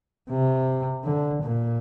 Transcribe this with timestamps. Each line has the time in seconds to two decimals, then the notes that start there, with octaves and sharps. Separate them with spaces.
0.30 C3
1.04 D3
1.43 A#2